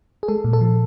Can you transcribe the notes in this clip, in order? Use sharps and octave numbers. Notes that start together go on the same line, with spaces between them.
G#4
G#3 A4
A#2
A4
F3